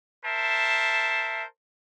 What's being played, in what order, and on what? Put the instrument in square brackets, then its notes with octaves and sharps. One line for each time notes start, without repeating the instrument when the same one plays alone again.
[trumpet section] A#4 C5 E5 A5